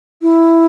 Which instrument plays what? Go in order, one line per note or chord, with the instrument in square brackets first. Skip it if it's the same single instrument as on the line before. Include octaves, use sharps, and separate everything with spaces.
[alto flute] E4